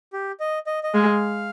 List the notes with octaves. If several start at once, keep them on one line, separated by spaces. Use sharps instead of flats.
G4
D#5
D#5
D#5
G#3 F5